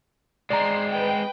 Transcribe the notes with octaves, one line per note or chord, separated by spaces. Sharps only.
G#3 C4 D5 A#5 C6 C7
B4 G5